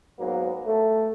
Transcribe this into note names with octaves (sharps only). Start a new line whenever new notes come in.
G#2 F#3 A#3 B3
A3